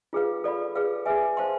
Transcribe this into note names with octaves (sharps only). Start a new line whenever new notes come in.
F4 G#4 B4 F5
A4 D5 F5 B5
G#4 B4 F5
G#4 B4 E5 G#5
C5 F5 A5 C6